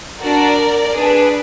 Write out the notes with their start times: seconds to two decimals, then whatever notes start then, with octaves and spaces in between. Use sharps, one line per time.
0.21 D4 F#4 A#4 D5
0.95 D4 G#4 B4